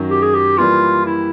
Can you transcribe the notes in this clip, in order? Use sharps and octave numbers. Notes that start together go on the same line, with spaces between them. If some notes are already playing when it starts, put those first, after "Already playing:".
Already playing: F#2 D#3 F#3
G4
G#4
G4
E3 G3 A#3 F4
E4